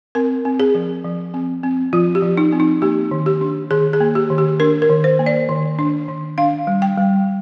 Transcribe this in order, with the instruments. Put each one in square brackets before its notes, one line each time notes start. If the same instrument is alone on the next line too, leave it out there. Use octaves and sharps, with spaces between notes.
[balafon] C4 A#4
C4
G#4
F3
F3
C4
C4
F3 F4
G4
F3
D#4
C4
D#4
A#3 G4
D#3
G4
D4
D#3 G#4
G#4
A#3
G4
D#3
G4
D4 A#4
A#4
D#3
C5
A#3
D5
D#3
D4
D#3
D4 F5
G3
G5
G3